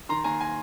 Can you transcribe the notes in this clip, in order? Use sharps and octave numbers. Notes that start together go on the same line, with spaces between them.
D#3 A#5 C6
D#2 G#5 A#5
G#5 A#5